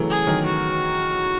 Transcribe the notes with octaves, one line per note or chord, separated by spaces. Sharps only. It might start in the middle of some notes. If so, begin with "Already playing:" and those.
Already playing: C#3 E3 F#3 A3
G#4
D#3 F#3
F#4